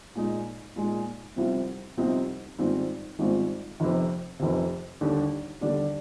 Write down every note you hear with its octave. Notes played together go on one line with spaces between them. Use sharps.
A#2 G#3 D#4
A#2 G#3 D#4
C2 C3 F3 C4 D#4
C2 C3 F3 C4 D#4
G#1 G#2 G3 C4 F4
G#1 G#2 G3 C4 F4
F1 F2 C3
F1 F2 C3
D#2 D3 G3 D4
D#2 D3 G3 D4